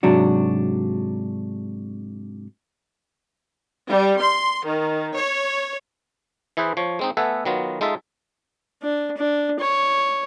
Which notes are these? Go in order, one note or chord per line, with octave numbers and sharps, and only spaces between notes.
G#2 C3 F#3 D4 F#4
G3
C6
D#3
C#5
E3 E4 G#4 B4 C5
F3 C#5
G#3 C4 D#4
A3 B3 A4 E5 F#5 G#5
D#3 F#3 B3 F4
G#3 D#4 F4 A4 E5
D4
D4
C#5